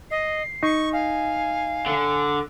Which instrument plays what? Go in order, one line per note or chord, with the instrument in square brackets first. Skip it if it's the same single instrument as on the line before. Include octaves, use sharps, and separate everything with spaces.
[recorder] D#5 [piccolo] C7
[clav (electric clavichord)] D#4 [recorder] C#6
[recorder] F5 [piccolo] G#5
[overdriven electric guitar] D3